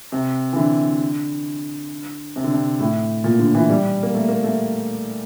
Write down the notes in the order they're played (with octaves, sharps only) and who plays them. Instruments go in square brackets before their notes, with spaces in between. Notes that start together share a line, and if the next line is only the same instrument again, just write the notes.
[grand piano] C3
E3
D3
C3
D3
C3
A2
A#2
D3
E3
G3
A#3
A3
A#3
A3